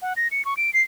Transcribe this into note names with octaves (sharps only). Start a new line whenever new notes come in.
F#5
A#6
C#7
C#6
D7
C7